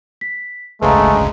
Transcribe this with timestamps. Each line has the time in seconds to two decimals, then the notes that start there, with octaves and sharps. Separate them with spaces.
0.21 B6
0.82 G#1 D2 C#3 G#3 A3 B4 F5 A#5